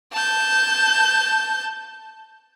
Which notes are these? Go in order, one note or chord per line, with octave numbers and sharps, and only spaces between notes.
A5 G6